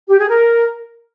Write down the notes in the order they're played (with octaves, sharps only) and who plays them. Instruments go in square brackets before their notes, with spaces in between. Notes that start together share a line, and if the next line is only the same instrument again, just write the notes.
[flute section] G4
G#4
A#4